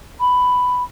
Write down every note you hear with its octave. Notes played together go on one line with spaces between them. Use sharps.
B5